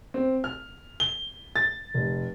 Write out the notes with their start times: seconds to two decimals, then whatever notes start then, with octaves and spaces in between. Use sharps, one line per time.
0.14 C4
0.44 F6
1.00 G7
1.56 A6
1.94 F1